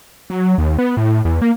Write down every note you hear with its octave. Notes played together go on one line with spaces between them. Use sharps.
F#3
D#2
B3
A2
E2
A#3